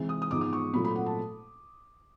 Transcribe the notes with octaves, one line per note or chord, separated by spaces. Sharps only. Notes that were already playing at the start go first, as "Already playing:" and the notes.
Already playing: C3 E3 G#3 C4
D#6
D#6
G#2 F3 G#3 B3 D#4 D6
D6
C#6
A#2 F#3 A3 C4 F4 B5
B5
F#5
A5